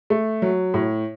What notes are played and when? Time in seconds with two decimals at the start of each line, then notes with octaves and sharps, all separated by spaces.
0.10 A3
0.42 F#3
0.74 A2